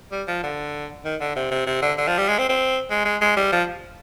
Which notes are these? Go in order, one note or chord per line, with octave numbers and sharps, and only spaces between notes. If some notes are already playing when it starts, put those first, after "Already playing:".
G3
F3
D3
D#3
D3
C3
C3
C3
D3
D3
F3
G3
G#3
C4
C4
G#3
G#3
G#3
G3
F3